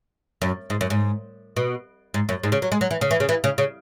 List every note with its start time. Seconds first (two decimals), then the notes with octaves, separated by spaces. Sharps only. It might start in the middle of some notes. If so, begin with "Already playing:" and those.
0.42 F#2
0.70 G#2
0.81 F#2
0.90 G#2
1.57 B2
2.14 G#2
2.29 F#2
2.43 G#2
2.52 C#3
2.62 F#3
2.72 G#3
2.81 F#3
2.91 E3
3.01 C#3
3.11 E3
3.20 C#3
3.29 E3
3.44 C#3
3.58 C#3